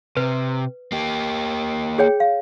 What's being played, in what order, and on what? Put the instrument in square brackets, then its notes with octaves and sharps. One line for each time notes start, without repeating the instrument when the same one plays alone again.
[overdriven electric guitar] C3 [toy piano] B4
[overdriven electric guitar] A#3 G4
[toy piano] G#4 C#5 G5
F5